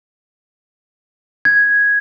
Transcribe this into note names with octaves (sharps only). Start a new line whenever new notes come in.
G#6